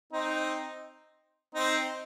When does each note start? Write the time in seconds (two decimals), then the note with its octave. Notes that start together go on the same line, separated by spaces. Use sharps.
0.13 C4 D#4
1.55 C4 D#4